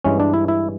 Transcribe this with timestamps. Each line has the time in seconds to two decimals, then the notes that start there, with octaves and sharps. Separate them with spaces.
0.05 G2 E3 G#3 C#4
0.20 D4
0.34 E4
0.48 E4